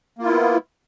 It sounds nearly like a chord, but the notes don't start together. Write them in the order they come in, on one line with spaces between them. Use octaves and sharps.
A#3 F4 E4 B3